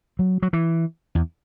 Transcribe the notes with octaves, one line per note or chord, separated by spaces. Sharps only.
F#3
F#3
E3
E2